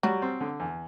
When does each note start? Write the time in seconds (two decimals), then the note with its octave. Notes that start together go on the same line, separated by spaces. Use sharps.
0.03 F#3 G3
0.22 C4
0.40 D3
0.60 E2